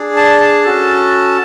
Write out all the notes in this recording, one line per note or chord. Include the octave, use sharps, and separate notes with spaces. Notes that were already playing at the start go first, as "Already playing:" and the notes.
Already playing: D4 G#4
A5
A5
C#4 F#4 A4